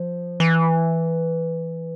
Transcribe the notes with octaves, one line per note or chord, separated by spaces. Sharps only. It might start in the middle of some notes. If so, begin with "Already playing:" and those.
Already playing: F3
E3